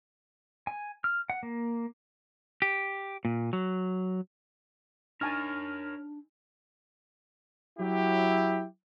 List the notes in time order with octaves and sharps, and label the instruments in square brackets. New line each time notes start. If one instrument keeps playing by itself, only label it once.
[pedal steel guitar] G#5
F6
F#5
A#3
[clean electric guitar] G4
A#2
F#3
[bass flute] D4 [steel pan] D#4 G#5 A5 [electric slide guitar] A#4 C#5 [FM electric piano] F6
[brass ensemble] F#3 E4 G4